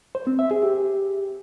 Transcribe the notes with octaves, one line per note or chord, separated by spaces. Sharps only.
C5
C4
E5
G#4
G4